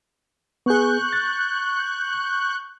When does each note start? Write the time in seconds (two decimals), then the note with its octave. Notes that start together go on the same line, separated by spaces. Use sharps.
0.66 B3 G#4 C#6 F#6 G6
1.13 A6